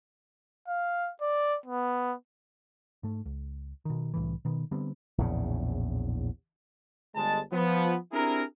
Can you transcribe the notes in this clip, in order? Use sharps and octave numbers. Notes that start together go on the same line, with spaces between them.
F5
D5
B3
G#2 A3
C#2
B2 D#3
C2 A2 E3
B2 D#3 B3
D3 G3 B3 C4
A#1 E2 A2 C#3
G1 G#3 A5
F3 B3
C4 D4 E4 G4 G#4 A#4